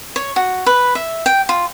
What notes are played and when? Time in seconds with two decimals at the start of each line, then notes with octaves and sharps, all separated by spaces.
0.16 C#5
0.36 F#4
0.66 B4
0.95 E5
1.26 G5
1.49 F4